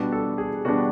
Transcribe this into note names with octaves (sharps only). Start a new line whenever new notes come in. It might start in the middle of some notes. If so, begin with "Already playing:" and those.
Already playing: B2 G3 B3 D4 F#4
A4
G#4
B2 G3 B3 D4 F#4